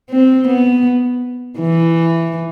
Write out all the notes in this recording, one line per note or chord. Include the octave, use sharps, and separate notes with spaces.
C4
B3
E3